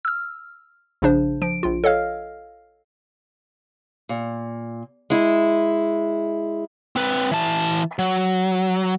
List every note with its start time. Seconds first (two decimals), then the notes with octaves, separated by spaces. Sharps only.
0.05 E6 F6
1.02 A#1 C#3 D4 C5
1.42 F3 D7
1.63 A#1 F4
1.84 A4 C#5 D#5 F5 F6
4.09 A#2
5.10 G#3 E4
6.96 C4 B4
7.31 E3 A5
7.99 F#3